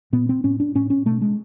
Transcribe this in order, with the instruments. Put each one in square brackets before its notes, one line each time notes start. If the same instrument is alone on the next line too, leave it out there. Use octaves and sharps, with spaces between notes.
[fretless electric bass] A#2 B3
C4
A2 C#4
D4
A2 C#4
C#4
B2 A3
G#3